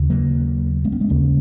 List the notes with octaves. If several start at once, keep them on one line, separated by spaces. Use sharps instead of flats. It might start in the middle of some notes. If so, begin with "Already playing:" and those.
Already playing: D#2 C#3
F#3 A#3
G#3 C4
A#3 C#4
G#3 C4
D#2 C#3 A#3 C#4